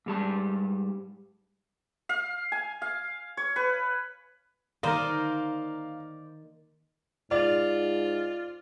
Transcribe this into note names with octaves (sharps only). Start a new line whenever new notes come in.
G#2 G3 A5
F5
G#5
F5
C#5
B4
D#3 A#3 A#4 C5 D5 D#5 F5 A#5
G#2 F4 D5